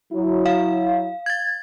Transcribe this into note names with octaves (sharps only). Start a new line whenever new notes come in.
F#3 E4
F5
G#6 A6